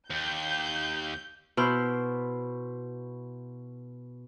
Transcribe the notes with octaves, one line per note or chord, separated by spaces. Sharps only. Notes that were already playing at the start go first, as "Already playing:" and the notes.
D#2 G6
B2 E4 C5 F6